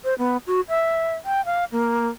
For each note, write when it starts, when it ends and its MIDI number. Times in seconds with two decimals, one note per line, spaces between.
0.04 0.14 72
0.19 0.37 59
0.47 0.61 66
0.69 1.14 76
1.25 1.45 79
1.45 1.65 77
1.72 2.08 58